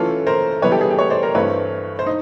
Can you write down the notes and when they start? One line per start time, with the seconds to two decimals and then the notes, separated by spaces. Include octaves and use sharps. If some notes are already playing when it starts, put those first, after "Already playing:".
Already playing: E3 A3 C#4 F4 A4 B4
0.27 A#4 C5
0.62 E3 G3 B3 B4 C#5
0.72 G4 A4
0.81 G#4
0.90 G4
0.99 B4 C#5
1.10 C5 D5
1.23 A#4 C5
1.35 G2 E3 A3 C4 B4 C#5
1.99 C5
2.06 D#4